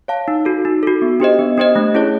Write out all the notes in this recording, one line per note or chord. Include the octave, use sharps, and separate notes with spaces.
C#5 F5 A5
D#4
F#4 A4
D#4
F#4 A4
B3
D4 G4 C5 D#5
B3
D4 G4 C5 D#5
A3
C#4 E4 G#4 C#5